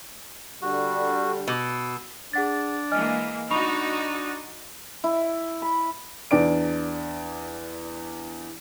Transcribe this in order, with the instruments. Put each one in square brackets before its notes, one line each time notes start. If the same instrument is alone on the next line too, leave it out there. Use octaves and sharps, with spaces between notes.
[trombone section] D3 G3 [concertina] F#4
[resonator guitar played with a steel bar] B2 [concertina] E6
[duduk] D4 [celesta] G#4 F#5 A6
[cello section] E3 G#3 A#3 [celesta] D#5 G#5 F6
[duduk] D4 [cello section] D#4 F#4 [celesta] B5 C#6 F7
[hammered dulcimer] E4
B5
[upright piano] E2 D4 D5 D7